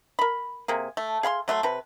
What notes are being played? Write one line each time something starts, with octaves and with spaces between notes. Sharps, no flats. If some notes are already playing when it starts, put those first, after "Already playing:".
A#4 B5
C3 A#3 G#4
A3
G#4 F5 B5 C6
F#3 A3 B4 C6
C3 B4